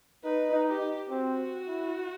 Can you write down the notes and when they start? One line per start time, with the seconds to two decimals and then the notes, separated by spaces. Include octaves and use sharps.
0.24 D#4 B4
0.52 D#4
0.67 G4
1.09 C4 F#4
1.67 E4